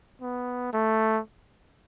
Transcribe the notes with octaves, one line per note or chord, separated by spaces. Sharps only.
B3
A3